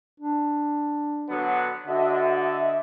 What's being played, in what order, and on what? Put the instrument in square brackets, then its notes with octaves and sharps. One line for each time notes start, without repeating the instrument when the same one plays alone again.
[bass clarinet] D4
[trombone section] D3 F#3 B3
[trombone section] D3 [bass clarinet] F#4 [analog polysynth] D#5 E5